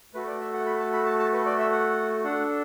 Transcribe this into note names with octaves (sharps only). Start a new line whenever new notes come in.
A3 F#4 A4 B4
D5
E5
F#5
B5
A5
B5
A5
A5
B4
D5
E5
F#5
D4 A4 F#5